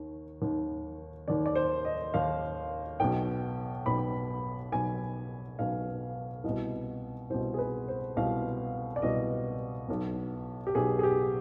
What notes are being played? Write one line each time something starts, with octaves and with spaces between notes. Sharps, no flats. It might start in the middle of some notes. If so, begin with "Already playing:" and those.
Already playing: D#2 D#3
D#2 D#3
D#2 D#3 D5
D5
C5
D#5
D#2 D#3 F5
B1 B2 G5
B1 B2 B5
B1 B2 G#5
B1 B2 F5
C2 B2 D#5
C2 B2 C5
G#4
B4
C5
C2 B2 F5
D5
C2 B2 D#5
B1 B2
G4
B1 B2 G#4
G#4
G4